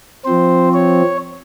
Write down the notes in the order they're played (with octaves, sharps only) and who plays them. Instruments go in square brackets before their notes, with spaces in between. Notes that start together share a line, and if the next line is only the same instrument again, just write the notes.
[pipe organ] F3 C4 C5
C#5